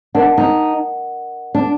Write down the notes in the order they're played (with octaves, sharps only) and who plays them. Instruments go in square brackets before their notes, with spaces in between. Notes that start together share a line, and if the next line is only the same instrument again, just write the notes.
[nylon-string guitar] D4 [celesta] A#4 D#5 F#5
[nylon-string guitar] D#4
D4